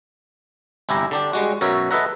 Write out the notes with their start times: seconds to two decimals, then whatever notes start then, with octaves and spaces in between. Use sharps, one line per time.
0.89 G1 C2 E4 G4 G#5 A#5
1.11 D3 D4 G4
1.33 G3 G#3 F#4
1.61 F#2 B2 F#4 A#4 C#5 E5
1.91 A4 B4 D#5 E5 F#5 A#5